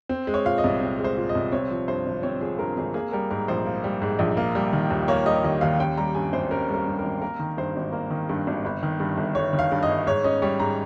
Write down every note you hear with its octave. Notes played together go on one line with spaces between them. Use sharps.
C4
G#3
C#5
A#2 F5
D#5
C2
C4
G#3
C5
A#2
D#5
C2
C4 C#5
F3
G2 C5
G#1
C4 C#5
F3 G#4
G2 A#4
G#1 G#4
A#3 G#4
G3 A#4
G#2 A#4
A#1 C5
A#3
G3
G#2
A#1
A#3
G3
D#3
D#2
A#3 C#5
G3 D#5
D#3 D#5
D#2 F5
C#4 G5
G3 A#5
G2 G#5
G#1 C5
C#4 A#4
G3
A#4
G2
G#1 A#4
A#3 A#4
D#3
G2 C5
G#1
A#3
D#3
G2
G#1
G1
D#3
G2
G1
G1 C#5
D#3
F5
G2
D#5
G1
G#2 C#5
C#4 D#5
G3 C#5
G#2 A#5